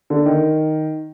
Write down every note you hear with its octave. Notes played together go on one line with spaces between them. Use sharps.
D3
D#3